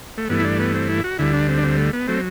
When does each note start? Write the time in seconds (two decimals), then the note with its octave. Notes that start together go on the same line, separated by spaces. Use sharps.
0.18 A3
0.29 G2 E3 A3 B3
0.39 E4
0.44 D4
0.59 B3
0.75 C4
0.89 E4
1.04 F#4
1.19 D2 D3 G3 E4
1.33 D4
1.49 C4
1.58 D4
1.63 C4
1.78 A3
1.93 B3
2.08 F#3 A3 C4